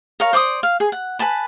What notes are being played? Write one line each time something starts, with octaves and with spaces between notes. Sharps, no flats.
A#4 C#5 F5
C5 D5 D6 D#6
F5
G#4
F#5
B4 G#5 A5 B5